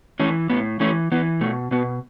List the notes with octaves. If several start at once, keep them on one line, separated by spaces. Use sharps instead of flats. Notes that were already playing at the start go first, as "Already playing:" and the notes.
E3 A3 C#4
A2 B3
E3 A3 C#4
E3 B3
B2 A3
B2 B3